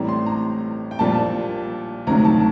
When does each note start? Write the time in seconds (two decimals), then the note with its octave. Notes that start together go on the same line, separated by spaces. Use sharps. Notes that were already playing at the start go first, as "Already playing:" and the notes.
Already playing: A1 A2 G3 C4 A#5
0.09 C6
0.26 A#5
0.91 G5
0.99 A#1 A#2 G3 A#3 A5
2.07 D2 C3 D#3 F#3 A#5
2.25 A5